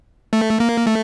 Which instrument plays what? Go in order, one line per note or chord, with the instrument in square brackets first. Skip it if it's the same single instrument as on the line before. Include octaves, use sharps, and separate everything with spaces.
[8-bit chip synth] A3
A#3
A3